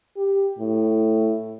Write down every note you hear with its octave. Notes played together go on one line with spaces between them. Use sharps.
G4
A2